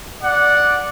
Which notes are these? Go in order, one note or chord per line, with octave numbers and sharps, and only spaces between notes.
D5 F#5